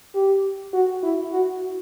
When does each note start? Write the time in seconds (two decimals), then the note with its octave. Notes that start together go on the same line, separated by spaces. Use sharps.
0.14 G4
0.74 F#4
1.03 E4
1.32 F#4